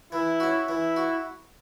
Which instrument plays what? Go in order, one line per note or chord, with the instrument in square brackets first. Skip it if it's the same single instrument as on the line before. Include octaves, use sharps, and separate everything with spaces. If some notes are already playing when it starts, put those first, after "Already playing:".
[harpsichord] E3 [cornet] E4
[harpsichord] C#4 F#4
[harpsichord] E3 [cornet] E4
[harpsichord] F#4